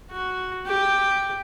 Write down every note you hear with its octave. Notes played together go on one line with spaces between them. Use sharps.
F#4
G4